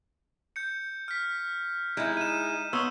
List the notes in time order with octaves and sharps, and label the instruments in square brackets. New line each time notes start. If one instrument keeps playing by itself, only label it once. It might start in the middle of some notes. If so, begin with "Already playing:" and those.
[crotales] G6 C#7
F6 B6
[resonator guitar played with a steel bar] G#3 E4 [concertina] D#4 [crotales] G6
[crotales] D#7 E7
[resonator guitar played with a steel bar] B3 [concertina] C#5 C6 [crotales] D#6 E6